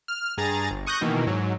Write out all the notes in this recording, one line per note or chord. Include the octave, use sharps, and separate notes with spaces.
F6
G2 G#4 A#5 A6
G1
C#6 D#6 F#6 G6 A#6
B2 D#3 E3 A#3
G#2 F#3